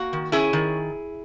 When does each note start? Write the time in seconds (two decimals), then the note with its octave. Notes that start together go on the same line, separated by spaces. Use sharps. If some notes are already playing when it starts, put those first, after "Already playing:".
Already playing: A#3 F#4
0.13 D#3
0.32 C#4 E4 G#4
0.53 D#3